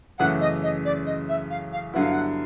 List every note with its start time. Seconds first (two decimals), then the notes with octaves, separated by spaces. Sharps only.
0.19 F#2 C#3 E3 A3 F#5
0.41 D#5
0.63 D#5
0.85 D5
1.06 D#5
1.29 E5
1.50 F5
1.73 F5
1.94 G2 D3 F#3 B3 E4 F#5
2.03 F5
2.12 F#5